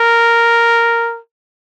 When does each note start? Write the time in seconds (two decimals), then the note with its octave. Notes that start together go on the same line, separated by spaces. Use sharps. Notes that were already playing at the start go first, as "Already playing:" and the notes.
Already playing: A#4